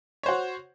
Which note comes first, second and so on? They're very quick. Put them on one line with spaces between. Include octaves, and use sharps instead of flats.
C#5 C5 F#4